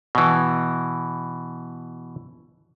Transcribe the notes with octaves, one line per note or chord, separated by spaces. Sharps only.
B2 E3